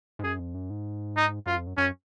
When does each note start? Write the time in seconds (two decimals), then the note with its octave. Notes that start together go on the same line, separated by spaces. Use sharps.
0.19 G#2
0.23 F#2 G#4
0.39 F2
0.55 F#2
0.70 G#2
1.16 D#4
1.46 F#2 F4
1.57 F2
1.67 F#2
1.77 F#2 C#4